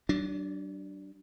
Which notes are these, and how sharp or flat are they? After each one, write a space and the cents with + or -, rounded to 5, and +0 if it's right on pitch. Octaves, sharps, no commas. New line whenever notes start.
F#3 +45 D4 +0